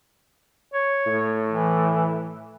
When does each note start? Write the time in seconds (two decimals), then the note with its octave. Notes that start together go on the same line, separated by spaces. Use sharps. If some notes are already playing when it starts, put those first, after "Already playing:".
0.74 C#5
1.06 A2
1.51 E3